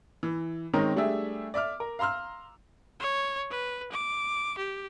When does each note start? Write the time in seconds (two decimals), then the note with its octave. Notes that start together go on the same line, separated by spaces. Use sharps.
0.23 E3
0.74 D#3 G#3 C4 C#4 D#4 A#4
0.96 G3 A3 D4 G4 G#4 E5
1.54 D5 E5 D6 F6
1.80 A#4
1.99 F5 A#5 C6 E6 F6
3.00 C#5
3.50 B4
3.92 D6
4.58 G4